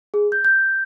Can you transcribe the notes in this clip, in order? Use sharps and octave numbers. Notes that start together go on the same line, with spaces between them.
G#4
G6
G6